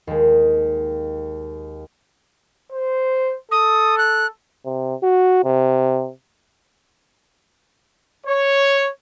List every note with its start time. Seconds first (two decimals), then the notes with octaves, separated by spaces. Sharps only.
0.07 D#2 G#3
2.72 C5
3.52 A4 D#6
3.98 F#6
4.65 C3
5.03 F#4
5.44 C3
8.25 C#5